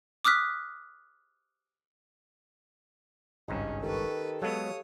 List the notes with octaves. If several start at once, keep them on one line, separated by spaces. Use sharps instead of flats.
D6 D#6 F6 F#6 B6
G#1 C#2 G2 C#4 D#4 G#4 A#5
D#3 G4 A4 B4 C#6
F#3 G#3 B3 A4 C#5 F5 D#6